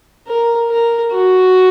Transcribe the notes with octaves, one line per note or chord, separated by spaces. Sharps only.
A#4
A#4
F#4